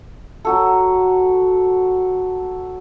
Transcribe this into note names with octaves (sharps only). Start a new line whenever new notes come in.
F#3 F#4 A4